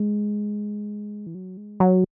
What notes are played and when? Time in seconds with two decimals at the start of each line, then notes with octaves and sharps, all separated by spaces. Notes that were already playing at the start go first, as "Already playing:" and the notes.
Already playing: G#3
1.26 E3
1.35 F#3
1.57 G#3
1.80 F#3